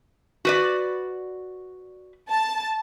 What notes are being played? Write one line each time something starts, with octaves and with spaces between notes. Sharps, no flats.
F#4 B4 D5
A5